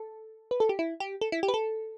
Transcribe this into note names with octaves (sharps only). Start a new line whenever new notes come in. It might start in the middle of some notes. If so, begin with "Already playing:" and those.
Already playing: A4
B4
A4
G4
E4
G4
A4
E4
G4
B4
A4